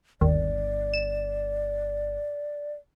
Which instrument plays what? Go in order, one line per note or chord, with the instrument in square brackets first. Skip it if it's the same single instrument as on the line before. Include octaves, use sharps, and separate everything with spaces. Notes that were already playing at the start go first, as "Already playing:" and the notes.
[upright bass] G1 [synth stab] D#2 [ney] D5
[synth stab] E7